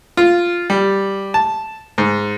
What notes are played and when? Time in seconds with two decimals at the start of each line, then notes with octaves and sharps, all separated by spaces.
0.17 F4
0.70 G3
1.34 A5
1.98 G#2